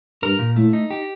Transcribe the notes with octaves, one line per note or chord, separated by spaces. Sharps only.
G2 A#4
A#2
A2 A3
D#4
G4